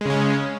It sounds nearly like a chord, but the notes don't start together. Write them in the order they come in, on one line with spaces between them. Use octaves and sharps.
G#3 C#3 C#4